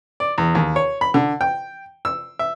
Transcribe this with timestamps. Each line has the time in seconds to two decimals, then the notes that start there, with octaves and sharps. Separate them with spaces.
0.20 D5
0.38 E2
0.55 D#2
0.76 C#5
1.01 B5
1.14 D3
1.41 G5
2.05 E6
2.39 E5